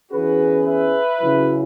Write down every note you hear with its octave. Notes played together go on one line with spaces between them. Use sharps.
E2 E3 C#4 F#4 G#4 B4
B4 E5
C#3 F#3 E4